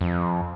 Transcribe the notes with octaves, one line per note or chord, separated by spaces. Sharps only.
F2